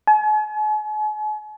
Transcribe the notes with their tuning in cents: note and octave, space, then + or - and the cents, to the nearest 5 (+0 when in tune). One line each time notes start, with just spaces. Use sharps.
G#5 +45